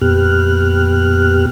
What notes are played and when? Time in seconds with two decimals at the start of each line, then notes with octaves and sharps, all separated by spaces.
0.01 F2 A#2 B3 G4 F6 F#6